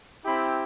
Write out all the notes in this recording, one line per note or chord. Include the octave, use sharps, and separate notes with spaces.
C4 E4 G4 B5